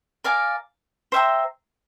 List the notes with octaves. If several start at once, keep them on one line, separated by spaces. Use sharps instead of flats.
A#4 D5 F5 G#5
C5 E5 G5 A#5